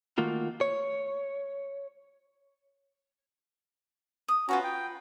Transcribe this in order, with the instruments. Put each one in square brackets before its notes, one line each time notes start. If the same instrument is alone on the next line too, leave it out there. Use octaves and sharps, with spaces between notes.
[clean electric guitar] D#3 A3 A#3 F4 F#4
C#5
[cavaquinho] D#6
[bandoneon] C#4 F#4 [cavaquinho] F4 B4 A#5
[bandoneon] G5